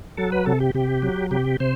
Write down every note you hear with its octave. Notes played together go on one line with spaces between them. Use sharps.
F#3 A4
B4
C3 A4
G4
C3 G4
F#3
C3 G4
C3 C5